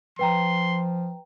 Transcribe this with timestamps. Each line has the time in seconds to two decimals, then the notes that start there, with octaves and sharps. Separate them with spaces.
0.19 F3 B4 G5 A#5 C6